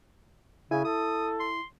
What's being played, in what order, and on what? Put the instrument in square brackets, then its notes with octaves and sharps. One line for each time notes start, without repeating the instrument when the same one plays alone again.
[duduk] C#3 [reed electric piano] E4 [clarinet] G#5
[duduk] A4 [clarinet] D#6
[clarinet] C6